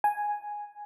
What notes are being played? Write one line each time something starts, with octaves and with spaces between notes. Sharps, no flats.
G#5